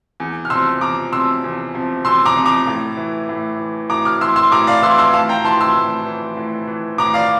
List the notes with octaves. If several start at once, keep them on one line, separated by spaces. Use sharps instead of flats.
E2
F6
C3 F3 C6 E6
E2 A#5 D6
C3 F3 C6 E6
E2
C3 F3
E2 C6 E6
A#5 D6
C3 F3
A#5 D6
A2
E3
A2
E3
A2 A#5 D6
D6 F6
E3 C6 E6
C6 E6
A2 A#5 D6
D5 F5
E3 C6 E6
C6 E6
A2 F5 A5
G5 A#5
E3 A5 C6
C6 E6
A2
E3
A2
E3
A2 A#5 D6
D5 F5